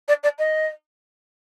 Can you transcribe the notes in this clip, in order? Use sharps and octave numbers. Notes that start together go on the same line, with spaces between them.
D5
D5
D#5